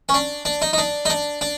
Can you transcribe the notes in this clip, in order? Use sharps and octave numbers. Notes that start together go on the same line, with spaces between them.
C#4
D4
D4
D#4
D#4
D4
D#4
D4
D4